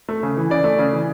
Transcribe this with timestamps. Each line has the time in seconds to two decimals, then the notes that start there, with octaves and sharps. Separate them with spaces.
0.09 A3
0.23 C#3
0.37 E3
0.50 C#3 D5
0.64 A3
0.79 C#3
0.92 E3